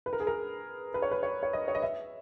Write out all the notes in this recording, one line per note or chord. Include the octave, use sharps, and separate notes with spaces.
B4
A#4
G#4
A#4
B4
C#5
B4
C#5
C#5
D#5
C#5
D#5
E5